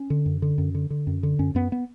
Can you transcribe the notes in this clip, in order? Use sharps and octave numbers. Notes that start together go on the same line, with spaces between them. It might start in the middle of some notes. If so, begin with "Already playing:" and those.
Already playing: C#4
D3
F#2
D3
F#2
D3
D3
F#2
D3
F#2 C#4
F#2 B3
B3